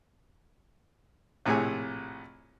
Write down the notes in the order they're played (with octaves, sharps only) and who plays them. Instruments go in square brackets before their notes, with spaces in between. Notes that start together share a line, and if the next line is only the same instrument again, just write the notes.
[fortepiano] A#1 A2 C3 G#4 G#5